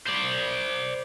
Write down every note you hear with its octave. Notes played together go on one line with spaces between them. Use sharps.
C5 D5